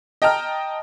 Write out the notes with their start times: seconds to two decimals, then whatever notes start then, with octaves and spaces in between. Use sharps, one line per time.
0.22 D#5 G5 A5 A#5 F6